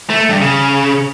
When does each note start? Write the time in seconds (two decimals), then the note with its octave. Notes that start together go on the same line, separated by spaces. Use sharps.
0.10 A3
0.29 G2
0.41 C#3